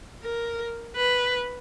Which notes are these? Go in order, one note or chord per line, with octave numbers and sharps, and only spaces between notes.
A#4
B4